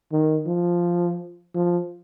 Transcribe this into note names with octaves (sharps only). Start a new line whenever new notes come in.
D#3
F3
F3